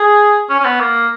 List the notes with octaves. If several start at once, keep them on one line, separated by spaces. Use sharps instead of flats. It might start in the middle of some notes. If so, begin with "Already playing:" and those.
Already playing: G#4
C#4
C#4
B3
A#3